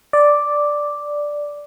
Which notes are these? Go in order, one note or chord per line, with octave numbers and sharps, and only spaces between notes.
D5